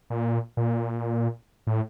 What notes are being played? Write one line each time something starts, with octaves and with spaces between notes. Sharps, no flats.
A#2
A#2
A2